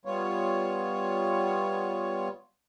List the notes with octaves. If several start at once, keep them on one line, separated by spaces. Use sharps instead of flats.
G3 B3 F4 C#5